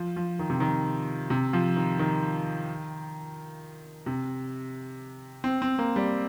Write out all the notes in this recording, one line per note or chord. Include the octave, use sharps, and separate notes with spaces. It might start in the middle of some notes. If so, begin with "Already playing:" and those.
Already playing: F3
F3
D#3
C3
D#3
C3
F3
D#3
D#3
C3
C4
C4
A#3
G3